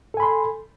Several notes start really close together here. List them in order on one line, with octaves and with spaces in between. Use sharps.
A4 G#5 B5 C6